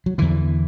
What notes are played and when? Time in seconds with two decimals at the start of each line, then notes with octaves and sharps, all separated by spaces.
0.06 F#3
0.18 E2 D3 E3